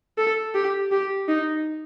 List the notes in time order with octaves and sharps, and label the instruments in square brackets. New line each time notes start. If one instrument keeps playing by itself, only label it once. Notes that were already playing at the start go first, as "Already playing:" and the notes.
[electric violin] A4
G4
G4
D#4